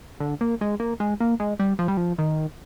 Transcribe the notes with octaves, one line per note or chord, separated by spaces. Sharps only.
D3
A#3
G#3
A#3
G#3
A#3
G#3
G3
F3
G3
F3
D#3